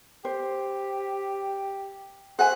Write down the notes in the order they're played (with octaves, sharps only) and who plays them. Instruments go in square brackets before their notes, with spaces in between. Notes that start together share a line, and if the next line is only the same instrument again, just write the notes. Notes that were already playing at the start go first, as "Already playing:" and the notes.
[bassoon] G4 [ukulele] C5
[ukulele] G#4 E5 G#5 [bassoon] C5 [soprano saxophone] F#5